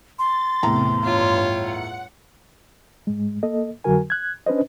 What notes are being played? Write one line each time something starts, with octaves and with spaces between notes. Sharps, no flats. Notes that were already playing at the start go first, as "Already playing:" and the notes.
C6 A6
E2 A2 C3 A#5
G2 F4 C#5
F#5 C#7
G#2 G#3
A#3 A4 D#5
F2 D3 F#3 F#4 A#4 G#5
F#6 G#6
C#4 D4 B4 C5 D#5